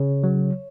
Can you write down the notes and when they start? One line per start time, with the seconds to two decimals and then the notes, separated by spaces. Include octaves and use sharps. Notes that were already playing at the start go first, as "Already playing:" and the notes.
Already playing: C#3 C#5
0.24 F#3